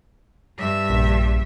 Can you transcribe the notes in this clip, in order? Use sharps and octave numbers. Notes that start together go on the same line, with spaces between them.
G2 E5
A#1